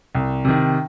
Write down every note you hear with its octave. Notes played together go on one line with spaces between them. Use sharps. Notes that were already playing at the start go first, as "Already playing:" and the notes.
C2
C3 D#3